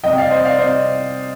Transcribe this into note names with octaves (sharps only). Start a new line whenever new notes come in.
C3 G3 D#5 G5
D5 F5
C5 D#5
D5 F5
C3 C5 D#5